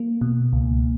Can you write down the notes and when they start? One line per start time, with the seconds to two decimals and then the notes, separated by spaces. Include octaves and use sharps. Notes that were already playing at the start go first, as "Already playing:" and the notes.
Already playing: A#3
0.21 B2
0.53 C#2